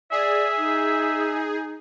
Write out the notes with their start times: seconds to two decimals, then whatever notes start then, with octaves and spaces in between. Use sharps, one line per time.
0.12 G#4 D5 E5
0.58 D#4